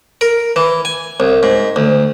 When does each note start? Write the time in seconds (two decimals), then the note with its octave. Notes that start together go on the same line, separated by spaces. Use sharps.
0.21 A#4
0.56 E3
0.85 G#5
1.20 C2
1.43 G#2
1.76 D2